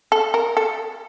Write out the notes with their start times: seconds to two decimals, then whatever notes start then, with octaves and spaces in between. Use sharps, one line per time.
0.12 A4
0.34 A#4
0.57 A4